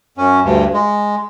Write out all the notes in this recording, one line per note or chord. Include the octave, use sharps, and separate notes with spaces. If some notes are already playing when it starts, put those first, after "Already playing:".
F#2 C#4
D2 G2
G#3